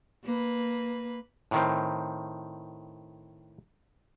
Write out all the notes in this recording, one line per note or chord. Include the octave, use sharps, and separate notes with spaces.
A#3 B4
A2 D#3 C4